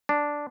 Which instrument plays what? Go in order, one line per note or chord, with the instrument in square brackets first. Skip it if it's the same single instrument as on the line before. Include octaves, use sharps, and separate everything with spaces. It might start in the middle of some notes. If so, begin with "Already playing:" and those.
[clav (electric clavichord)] D4